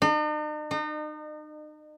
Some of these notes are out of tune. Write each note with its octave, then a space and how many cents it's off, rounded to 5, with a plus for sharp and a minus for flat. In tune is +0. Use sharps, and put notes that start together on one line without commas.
D#4 -45
D#4 -35